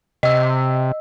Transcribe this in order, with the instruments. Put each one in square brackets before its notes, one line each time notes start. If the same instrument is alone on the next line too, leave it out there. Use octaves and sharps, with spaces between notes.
[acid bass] C3 [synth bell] D#5 E6